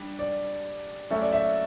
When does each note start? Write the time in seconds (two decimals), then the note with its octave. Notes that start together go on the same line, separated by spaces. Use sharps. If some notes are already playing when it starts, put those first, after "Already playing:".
Already playing: G3 D4
0.19 D5
1.10 F#3 A3 C#4 F#4 A4 E5
1.21 D5
1.33 E5